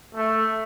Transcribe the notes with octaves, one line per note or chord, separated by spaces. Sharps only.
A3